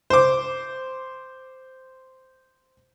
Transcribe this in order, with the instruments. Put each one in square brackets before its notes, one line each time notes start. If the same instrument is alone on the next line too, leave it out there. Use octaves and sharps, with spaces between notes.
[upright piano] C5 D6